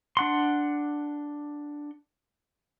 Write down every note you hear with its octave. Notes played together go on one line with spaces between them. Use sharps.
D4 F#5 C6